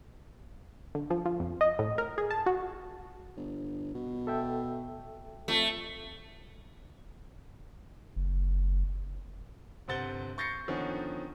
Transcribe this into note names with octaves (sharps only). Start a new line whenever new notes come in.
D3
F3
F3
F2
D#5
A2
A#4
G#4
A5
F#4
G1
B2
A4 E5 G5
F2 A3
F#1
G1 C3 C5 F#5 A6 G7
C#6 G6 A6 A#6 C7 C#7
D3 D#3 F3 B3 C#4